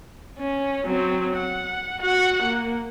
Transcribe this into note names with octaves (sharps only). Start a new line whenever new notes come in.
C#4
F#3 C4
F#5
F#4 F#5
A#3